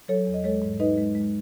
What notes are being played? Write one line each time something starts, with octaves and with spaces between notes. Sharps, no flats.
F#3 A4 C#5
E2
D#5
G#3 A4 C#5
G#2
D#4 B4 D#5
G#3
G#3